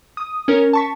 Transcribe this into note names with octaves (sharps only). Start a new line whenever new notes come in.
D#6
C#4 A#4
A5 C#6 B6